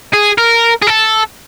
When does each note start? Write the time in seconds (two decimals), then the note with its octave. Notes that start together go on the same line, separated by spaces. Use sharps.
0.13 G#4
0.38 A#4
0.82 G#4
0.87 A4